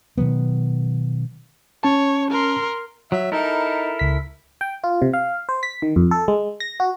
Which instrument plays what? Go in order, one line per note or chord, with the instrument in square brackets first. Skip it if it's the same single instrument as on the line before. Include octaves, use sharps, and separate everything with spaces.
[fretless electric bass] B2 D#3 F#3 B3
[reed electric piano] C#4 A5 [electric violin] C#5
[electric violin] A#4 C6
[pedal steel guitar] F#3 [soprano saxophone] E5
[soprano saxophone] D#4 [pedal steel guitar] E4 A4 A#4
[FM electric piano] C#2 B6
G5
F4
C3
F5
C5
B6
D#3
F2
A4
G#3
A#6
F#4